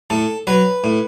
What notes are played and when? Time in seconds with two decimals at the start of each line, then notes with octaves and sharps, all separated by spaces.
0.10 A2 A4
0.47 F#3 B4
0.84 A2